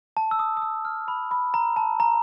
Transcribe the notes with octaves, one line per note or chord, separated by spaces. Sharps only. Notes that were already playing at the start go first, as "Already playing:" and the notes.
A5
E6
D#6
D#6
E6
F6
B5
B5
A#5
A5
A#5